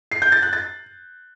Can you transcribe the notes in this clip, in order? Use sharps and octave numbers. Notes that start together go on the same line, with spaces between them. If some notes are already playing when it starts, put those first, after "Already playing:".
C7
G6
A6
F#6
A6